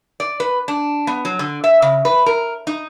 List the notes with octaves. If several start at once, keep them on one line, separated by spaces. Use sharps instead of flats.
D5
B4
D4
B3
F#3
D3
E5
C#3
B4
A#4
D#4